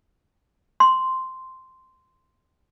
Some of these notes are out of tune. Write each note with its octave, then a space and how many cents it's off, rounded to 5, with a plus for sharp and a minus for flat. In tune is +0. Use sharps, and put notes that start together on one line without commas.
C6 -5